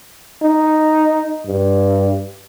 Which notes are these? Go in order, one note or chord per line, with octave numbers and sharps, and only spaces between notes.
D#4
G2